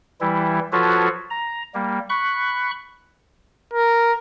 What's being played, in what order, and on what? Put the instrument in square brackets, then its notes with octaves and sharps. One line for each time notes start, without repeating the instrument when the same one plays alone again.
[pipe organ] E3 G3 E4
F3 F4 F#4 A4 B4 C#5
A#5
G3 A#3
B5 C#6 F#6
[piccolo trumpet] A#4